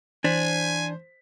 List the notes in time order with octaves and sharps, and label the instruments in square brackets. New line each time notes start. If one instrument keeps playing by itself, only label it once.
[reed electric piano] E3 [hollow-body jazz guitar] D4 [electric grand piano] C5 B6 [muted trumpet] G#5